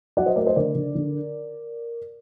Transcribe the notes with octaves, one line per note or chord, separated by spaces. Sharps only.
F#3 D5 F#5
C5 D#5
A3 A#4 D5
C5 D#5
D3 A#4 D5
D3
D3